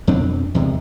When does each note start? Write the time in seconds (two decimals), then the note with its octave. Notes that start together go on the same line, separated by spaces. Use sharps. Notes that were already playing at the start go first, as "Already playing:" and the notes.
0.07 F2 B2 C4 D4
0.55 E2 C3 D#3 G#3